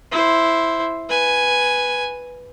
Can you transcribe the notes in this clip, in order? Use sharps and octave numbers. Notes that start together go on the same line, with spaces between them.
E4 C5
B4 G#5